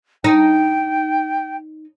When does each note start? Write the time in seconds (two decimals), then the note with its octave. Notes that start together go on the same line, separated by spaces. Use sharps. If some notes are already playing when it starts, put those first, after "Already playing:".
0.24 D#4 G5